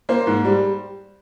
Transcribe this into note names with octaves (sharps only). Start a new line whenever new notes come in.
A#3 C5
G#2
G3